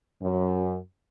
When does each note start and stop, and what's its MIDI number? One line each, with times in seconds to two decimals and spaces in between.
0.21 0.76 42